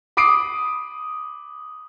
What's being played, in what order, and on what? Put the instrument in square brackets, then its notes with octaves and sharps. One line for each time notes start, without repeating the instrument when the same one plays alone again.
[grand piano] B5 D6 D#6 C7 D7